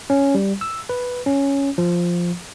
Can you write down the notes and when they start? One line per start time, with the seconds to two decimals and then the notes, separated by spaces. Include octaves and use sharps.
0.10 C#4
0.35 G3
0.61 E6
0.89 B4
1.26 C#4
1.78 F3